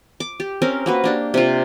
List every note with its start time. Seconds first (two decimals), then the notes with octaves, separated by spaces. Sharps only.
0.20 D6
0.40 G4
0.62 C4 C#4 A#4
0.86 A#3 F#4 B4
1.04 A#3 D4 G4
1.34 C3 F4